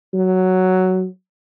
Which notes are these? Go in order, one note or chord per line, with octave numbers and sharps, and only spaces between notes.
F#3